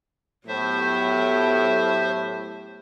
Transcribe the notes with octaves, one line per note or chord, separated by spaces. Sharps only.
A2 F#3 B3 G4 C5 E5